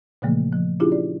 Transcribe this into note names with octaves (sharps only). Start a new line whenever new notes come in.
A#2 C#3 E3 F3 A3 A#3
F3
C#4 D4 E4 F4 G4 G#4
D5